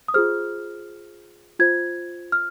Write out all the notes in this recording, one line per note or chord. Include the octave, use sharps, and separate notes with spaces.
D#6
F4 G#4 C5 F6
F4 C5 G#6
F6